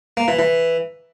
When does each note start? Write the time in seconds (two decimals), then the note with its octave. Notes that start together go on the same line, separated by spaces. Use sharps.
0.17 A#3
0.28 E3
0.39 E3